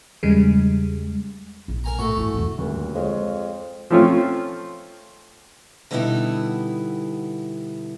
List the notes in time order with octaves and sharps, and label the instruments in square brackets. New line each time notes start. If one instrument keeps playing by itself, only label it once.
[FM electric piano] E2 C#3 G3 G#3
[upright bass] A#1
[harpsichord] A#4 G#5 A#5
[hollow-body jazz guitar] A2 [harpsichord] A3 F#4
[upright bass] G2 E4
E1 E2
[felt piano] D#1 D2
[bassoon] F2 [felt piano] G#3 C#5
[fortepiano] F3 A3 C4 C#4 F4
[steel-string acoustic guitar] B2 D3 G3 B3 D#4 E4